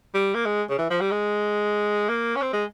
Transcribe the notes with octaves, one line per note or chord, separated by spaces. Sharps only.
G3
A#3
G#3
C#3
E3
F3
G3
G#3
A#3
C#4
C4
G#3